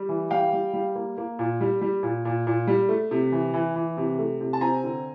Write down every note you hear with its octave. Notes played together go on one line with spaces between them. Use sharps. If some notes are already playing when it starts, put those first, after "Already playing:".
Already playing: G3
E3
G3 F5 G5
G3
G3
A#3
A#3
A#2
G3
G3
A#2
A#2
A#2
G3
A3
C3
E3
E3
E3
C3
A3
C3
A5
C4 G#5 A#5
D3